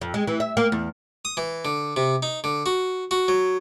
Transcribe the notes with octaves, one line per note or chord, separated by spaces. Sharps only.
F2
G#3
E3
E5
A#3
E2
D#6
E3
D3
C3
D#4
D3
F#4
F#4
F#3